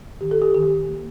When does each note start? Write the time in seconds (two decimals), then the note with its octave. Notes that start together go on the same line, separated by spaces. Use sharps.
0.21 D#3 G4
0.31 A4
0.42 G4
0.54 D#3 G4
0.88 A#3